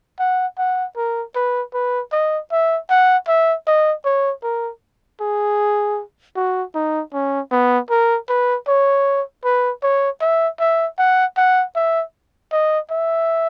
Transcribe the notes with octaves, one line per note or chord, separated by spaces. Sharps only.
F#5
F#5
A#4
B4
B4
D#5
E5
F#5
E5
D#5
C#5
A#4
G#4
F#4
D#4
C#4
B3
A#4
B4
C#5
B4
C#5
E5
E5
F#5
F#5
E5
D#5
E5